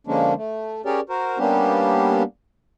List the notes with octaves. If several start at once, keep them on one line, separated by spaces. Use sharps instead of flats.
D3 F3 G#3 A#3 C#4 D4
A3
C#4 G4 G#4 A#4 C#5 D5
F#4 A#4 C5
G3 A#3 B3 C#4 D4 G4